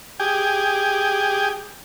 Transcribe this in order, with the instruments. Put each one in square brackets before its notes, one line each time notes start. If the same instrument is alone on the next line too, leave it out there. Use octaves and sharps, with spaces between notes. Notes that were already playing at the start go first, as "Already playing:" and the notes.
[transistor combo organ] G4 G#4